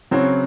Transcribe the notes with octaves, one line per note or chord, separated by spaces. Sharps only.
C#3 F#3 C4 F#4 C#5